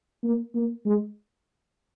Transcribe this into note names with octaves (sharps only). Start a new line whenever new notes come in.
A#3
A#3
G#3